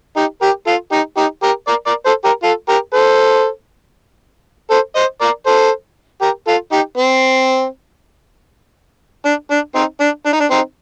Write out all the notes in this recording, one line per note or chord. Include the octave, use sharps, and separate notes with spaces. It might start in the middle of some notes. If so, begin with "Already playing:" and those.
D#4 G4
G4 A#4
F4 A4
D#4 G4
D#4 G4
G4 A#4
A#4 D5
A#4 D5
A4 C5
G4 A#4
F4 A4
G4 A#4
A4 C5
A4 C5
C5 D#5
A#4 D5
A4 C5
G4 A#4
F4 A4
D#4 G4
C4
D4
D4
C4 D#4
D4
D4
D#4
D4
C4 D#4